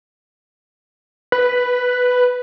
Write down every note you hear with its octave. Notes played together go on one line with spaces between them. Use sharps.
B4